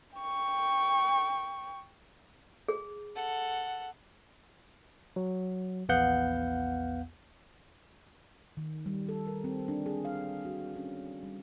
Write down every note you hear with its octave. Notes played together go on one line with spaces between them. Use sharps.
G5 C#6
G#4
A4 F#5
F#3
A#1 E2 B3 F5 F#5 G6
D#3
G3
A4
A#4
C4
D4
G#4
F5
F#4
C#4
G3